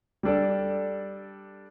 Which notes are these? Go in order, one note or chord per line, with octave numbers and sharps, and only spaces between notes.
G3 D4 A4 D5